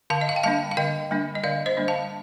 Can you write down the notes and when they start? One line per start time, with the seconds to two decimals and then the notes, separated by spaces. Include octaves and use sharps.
0.10 D3 F5 A5
0.21 D#5
0.29 F5
0.36 G5
0.43 G3 A#3 D4 F5 A5
0.71 F5
0.77 D3 D#5 G5
1.11 G3 A#3 D4
1.35 D#5
1.43 D3 D5 F5
1.66 C5 D#5
1.77 G3 A#3 D4
1.88 F5 A5